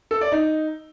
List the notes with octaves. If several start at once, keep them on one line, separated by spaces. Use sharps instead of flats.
A4
D5
D#4